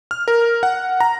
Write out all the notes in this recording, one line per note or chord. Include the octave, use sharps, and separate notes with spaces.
F6
A#4
F#5
A#5